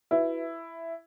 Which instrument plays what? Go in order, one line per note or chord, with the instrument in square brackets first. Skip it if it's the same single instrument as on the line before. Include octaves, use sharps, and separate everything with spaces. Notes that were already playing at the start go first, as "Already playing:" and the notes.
[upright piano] E4 [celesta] F#4 B4 E5